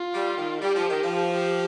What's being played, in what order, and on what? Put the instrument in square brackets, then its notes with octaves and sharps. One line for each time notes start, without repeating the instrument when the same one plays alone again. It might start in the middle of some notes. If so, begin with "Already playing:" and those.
Already playing: [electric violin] F4
[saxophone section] G3
D#3
[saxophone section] G3 [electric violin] G4
[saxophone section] F3
D#3
F3
[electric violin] G4